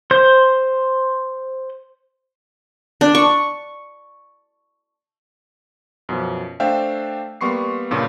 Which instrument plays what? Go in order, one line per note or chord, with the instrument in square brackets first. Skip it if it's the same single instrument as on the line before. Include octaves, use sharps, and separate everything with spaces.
[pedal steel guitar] C5 G6
[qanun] D4
C#6
[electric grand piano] F#2 B2 F3
A3 D4 C5 E5 F5 G5
G3 A#3 B3 C6 C#6 C7
G2 A#2 C#3 C#4